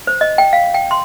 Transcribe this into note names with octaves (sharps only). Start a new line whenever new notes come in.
C5
D#5
G5
F5
G5
C6